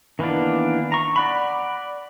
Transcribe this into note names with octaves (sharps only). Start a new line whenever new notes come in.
D#3 E3 A#3 B3 D4
A#5 C#6
D5 F#5 B5